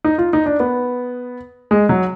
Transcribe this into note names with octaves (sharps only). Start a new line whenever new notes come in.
D#4
F4
D#4
D4
B3
G#3
F#3